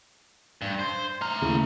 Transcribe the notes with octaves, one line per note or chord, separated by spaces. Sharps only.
G2
C5
A3 A#5 F6
D#2 C#3 E4